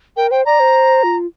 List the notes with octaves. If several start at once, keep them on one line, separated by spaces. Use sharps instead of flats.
A#4 G5
C5 G5
D5 A#5
C5
F4